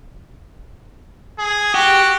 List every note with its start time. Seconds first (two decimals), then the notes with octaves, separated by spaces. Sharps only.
1.39 G#4
1.75 F#4 G4